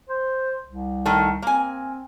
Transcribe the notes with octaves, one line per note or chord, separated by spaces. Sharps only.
C5
C2
D#3 A3
A#3 C4 G#5